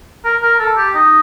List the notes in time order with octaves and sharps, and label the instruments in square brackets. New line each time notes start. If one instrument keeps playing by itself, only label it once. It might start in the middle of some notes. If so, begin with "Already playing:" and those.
[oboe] A#4
A#4
A4
G4
D#4